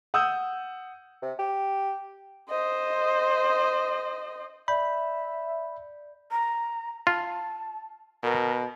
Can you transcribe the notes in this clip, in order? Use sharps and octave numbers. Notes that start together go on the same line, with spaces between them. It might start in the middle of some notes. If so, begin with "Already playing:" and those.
F#5 D#6 E6 G6
C3
G4
C5 D#5
D5 E5 B5 G6
A#5
F4 A5
B2 A#4